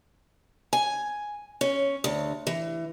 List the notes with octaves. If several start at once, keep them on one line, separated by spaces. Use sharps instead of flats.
G#5
C#4
D2
E3